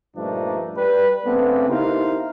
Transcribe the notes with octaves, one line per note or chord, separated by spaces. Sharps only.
G2 A#2 F3 A3 D4 D#4
G3 B4
C#3 A3 B3 C4 D4 B4
D#4 E4 G4 A#4 C5 F5